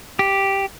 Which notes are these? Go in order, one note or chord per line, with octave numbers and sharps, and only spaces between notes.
G4